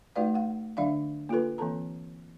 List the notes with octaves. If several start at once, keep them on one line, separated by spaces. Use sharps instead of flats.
A3 D#4 F#4 B4 D5 F5
F5 F#5
D3 F#3 D4 D5 E5 F5
A#3 F4 G4 A4 B4
E3 A#3 C4 A4 A5 A#5